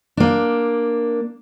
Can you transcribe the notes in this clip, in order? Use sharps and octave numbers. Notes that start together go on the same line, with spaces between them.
A#3 D4